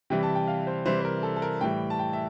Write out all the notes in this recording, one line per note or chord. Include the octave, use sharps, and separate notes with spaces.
C3 E3 G3 G5
A5
G5
F5
C5
C3 E3 G3 C5
C5
A#4
A4
A4
A#4
A2 E3 G3 G5
A5
G5
E5